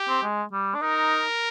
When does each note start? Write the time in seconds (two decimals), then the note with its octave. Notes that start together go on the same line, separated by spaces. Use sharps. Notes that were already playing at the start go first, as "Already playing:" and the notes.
Already playing: G4
0.09 C4
0.23 G#3
0.52 G3
0.75 D4
0.81 D#4 A#4